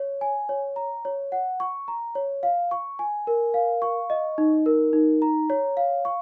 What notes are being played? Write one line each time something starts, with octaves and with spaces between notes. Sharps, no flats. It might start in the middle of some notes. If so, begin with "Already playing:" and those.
Already playing: C#5
G#5
C#5
A#5
C#5
F#5
C#6
A#5
C#5
F5
C#6
G#5
A#4
F5
C#6
D#5
D#4
A#4
D#4
A#5
C#5
F5
C#6